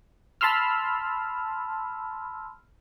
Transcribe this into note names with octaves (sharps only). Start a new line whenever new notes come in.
A5 B5 C6 E6 F6